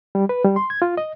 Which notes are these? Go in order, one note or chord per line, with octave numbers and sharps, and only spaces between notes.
G3
B4
G3
C6
G#6
F4
D#5